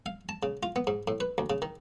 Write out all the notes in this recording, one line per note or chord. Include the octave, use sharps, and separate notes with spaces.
F5
A5
C#3
F4
B3
G#2
A2
B4
D2
C#3
D#3